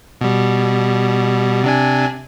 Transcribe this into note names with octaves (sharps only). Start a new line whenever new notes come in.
B2 G3
C3 D4 G#5